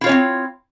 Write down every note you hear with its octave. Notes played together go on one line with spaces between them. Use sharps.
C4 C#4 E4 F4 C#5